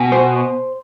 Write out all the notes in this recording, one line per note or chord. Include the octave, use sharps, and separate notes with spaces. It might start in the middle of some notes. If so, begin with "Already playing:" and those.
Already playing: B2 G#5
C5